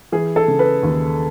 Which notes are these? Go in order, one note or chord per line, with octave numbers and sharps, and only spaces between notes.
E3 G#4
A4
C#3
B4
D#2